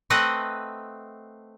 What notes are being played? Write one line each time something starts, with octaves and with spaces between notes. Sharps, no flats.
A3 C4 B4 D#5 F#5